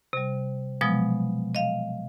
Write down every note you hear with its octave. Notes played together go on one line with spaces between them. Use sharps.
C3 G3
B2 F3 F#3 G#3 B3 D#6
D#5 F5